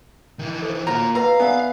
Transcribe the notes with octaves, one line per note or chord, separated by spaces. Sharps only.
D#3 E3
A4 C5
A#3 F4 C#5 A#5
B4 D#5 F5 A#5
B3 D5 E5 G#5